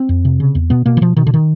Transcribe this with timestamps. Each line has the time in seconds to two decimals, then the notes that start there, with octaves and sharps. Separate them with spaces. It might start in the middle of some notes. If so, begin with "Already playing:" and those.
Already playing: C4
0.09 F2
0.25 C3
0.40 C#3
0.55 E2
0.70 B2 B3
0.86 B2 A#3
0.97 E3
1.01 B2 F3
1.17 B2 D#3
1.27 D3
1.34 D#3